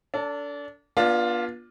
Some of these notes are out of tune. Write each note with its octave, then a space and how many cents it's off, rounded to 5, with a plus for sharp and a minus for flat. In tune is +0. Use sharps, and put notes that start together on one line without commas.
D4 -30 A4 +25
B3 -40 D4 +0 F4 +5